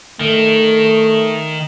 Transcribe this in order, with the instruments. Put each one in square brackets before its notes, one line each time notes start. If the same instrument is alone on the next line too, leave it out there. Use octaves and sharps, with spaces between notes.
[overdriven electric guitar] D#3 [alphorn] A3